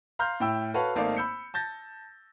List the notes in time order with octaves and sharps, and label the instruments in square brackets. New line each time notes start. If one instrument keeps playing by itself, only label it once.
[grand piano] F5 A#5 C6 F6 G6
A2 E4 G5 E6
F#4 A4 B4 C#5 F5 F#5
G#1 A3 A#3 D#4 D5 F5
B5 E6 G6 C#7
A5 G6 A6 A#6